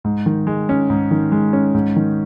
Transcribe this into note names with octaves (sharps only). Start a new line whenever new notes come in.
G#2
D#3
G#3
C#4
G#2
D#3
G#3
C#4
G#2
D#3